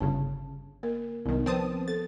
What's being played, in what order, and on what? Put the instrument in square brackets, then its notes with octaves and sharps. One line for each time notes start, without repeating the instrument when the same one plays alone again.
[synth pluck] G1 C#3 [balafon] A5
[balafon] A#3 A#4
[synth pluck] C2 D#3 [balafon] B3 A#4
[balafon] F3 B4 C5 [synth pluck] C4 A5 D#6
[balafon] A4 [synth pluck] A6